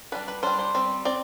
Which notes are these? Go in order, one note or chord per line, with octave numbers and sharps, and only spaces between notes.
G3 D4 B4
B4
G3 D4 C5
C5
G3 C4
C4 D5